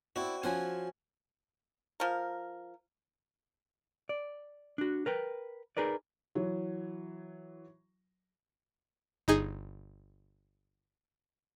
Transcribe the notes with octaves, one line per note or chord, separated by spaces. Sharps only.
C4 E4 F#4 D5
F3 C#4 F#4 C5 G#5
F3 A#4
D5
D4 F#4
A#4 B4 G5
D#4 G#4 A#4 B4 D5
E3 F#3
G1 D#4 G#4